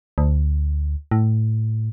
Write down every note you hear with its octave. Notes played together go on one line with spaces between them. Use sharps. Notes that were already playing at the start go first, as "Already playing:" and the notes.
D2
A2